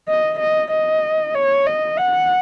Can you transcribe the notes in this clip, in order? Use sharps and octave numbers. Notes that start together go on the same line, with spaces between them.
D#5
D#5
D#5
C#5
D#5
F#5